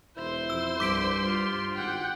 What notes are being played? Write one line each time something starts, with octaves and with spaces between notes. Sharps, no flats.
E1 E4 C5 C6
F2 E6
C2 G2 D6 B6 D7
F4
G#1 F#5 G5